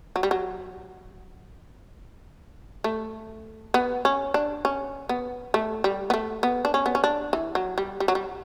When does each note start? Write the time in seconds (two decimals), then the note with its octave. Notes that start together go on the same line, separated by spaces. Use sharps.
0.16 F#3
0.23 G3
0.31 F#3
2.84 A3
3.74 B3
4.05 C#4
4.34 D4
4.65 C#4
5.09 B3
5.54 A3
5.84 G3
6.10 B3
6.14 A3
6.43 B3
6.65 D4
6.74 C#4
6.86 B3
6.95 C#4
7.04 D4
7.33 E3
7.55 F#3
7.78 G3
8.00 G3
8.08 F#3
8.15 G3